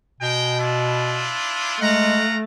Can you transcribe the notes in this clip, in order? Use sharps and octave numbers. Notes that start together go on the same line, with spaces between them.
B2 G#3 G5
D4 E4 F4
G#3 A3 F4 F#5 A#5